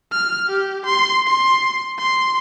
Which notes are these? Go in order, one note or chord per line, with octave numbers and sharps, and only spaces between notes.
F6
G4
C6
C6
C6